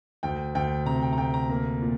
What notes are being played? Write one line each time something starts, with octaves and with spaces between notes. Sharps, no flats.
D2 G5
D2 G5
C3 A#5
G5
A#5
D2 G5
A#5
A#3 A#5
A#2